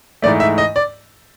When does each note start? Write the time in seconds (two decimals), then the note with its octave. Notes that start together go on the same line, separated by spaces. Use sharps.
0.22 G#2 E3 A3 D5
0.40 E5
0.58 D#5
0.76 D5